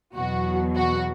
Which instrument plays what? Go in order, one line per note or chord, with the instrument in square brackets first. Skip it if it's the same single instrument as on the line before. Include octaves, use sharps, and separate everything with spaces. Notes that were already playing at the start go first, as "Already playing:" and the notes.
[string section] E2 B2 F#3 F#4
F#4